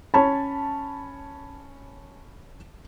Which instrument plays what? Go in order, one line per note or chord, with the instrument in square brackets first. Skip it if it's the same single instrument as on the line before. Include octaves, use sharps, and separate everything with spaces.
[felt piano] C#4 C#5 B5 [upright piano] A5